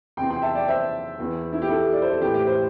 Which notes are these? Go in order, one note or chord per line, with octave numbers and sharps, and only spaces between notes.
E2 C3 E3 G5 C6
G5 C6
E5 A5
D5 G5
C5 E5
E2 E3
E4
G4
E4 A4
D5
C5
A4
A2 E3 G4
G4
G4 C5